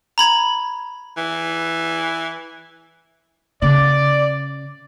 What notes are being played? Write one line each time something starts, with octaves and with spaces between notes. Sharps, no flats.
A#5 B5 G#6
E3
C#3 D5